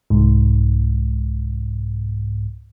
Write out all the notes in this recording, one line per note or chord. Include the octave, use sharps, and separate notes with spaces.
C2 G#2